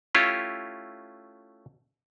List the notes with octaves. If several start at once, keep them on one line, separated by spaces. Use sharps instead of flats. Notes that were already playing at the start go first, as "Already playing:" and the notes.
A3 C#4 E4 F4 G4